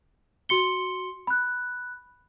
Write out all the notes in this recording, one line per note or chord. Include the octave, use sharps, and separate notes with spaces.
F#4 C6 C#7 G7
B5 F#6